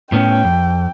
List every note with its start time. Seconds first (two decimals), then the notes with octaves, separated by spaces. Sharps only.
0.12 A2 B3 C#4 G5
0.44 F2